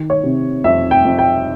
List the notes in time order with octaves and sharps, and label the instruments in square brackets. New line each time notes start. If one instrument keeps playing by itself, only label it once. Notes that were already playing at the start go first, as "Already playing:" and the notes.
Already playing: [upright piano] D#3
C#5
C3
F2 E5
G5
F2
G5